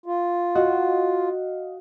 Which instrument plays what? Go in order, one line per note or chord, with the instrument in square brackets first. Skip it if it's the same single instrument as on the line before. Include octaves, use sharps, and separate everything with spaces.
[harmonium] F4
[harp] F#4 [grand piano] D#5 F5